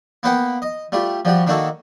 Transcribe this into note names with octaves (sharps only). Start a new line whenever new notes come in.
A#3 B3 B4 C5 F#5 G5
D#5
G3 A3 F4 G4
F3 G3 F#4 G4
D#3 A#3 D4 D#4 F#4 A4